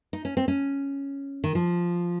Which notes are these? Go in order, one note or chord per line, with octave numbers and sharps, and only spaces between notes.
D#4
C#4
C4
C#4
D#3
F3